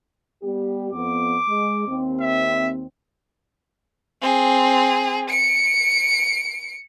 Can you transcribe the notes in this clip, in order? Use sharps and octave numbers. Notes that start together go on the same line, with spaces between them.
G3 B3 G4
F2 B3 D6
G#3
D#2 C4
E5
C4 G#4
C#7 D7